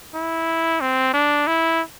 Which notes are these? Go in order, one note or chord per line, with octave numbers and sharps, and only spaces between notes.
E4
C4
D4
E4